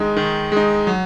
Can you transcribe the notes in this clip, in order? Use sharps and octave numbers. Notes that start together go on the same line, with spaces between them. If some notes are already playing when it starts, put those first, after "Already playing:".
Already playing: D#3 G#3 D#4
D#3
G#3 D#4
F#3